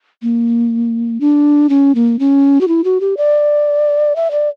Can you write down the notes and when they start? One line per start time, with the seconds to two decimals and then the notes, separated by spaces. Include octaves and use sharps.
0.23 A#3
1.20 D4
1.69 C#4
1.95 A#3
2.19 C#4
2.61 F#4
2.68 E4
2.84 F#4
3.01 G4
3.17 D5
4.16 E5
4.31 D5